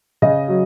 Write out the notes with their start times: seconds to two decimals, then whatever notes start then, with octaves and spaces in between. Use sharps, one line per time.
0.22 C#3 D#5
0.48 F#3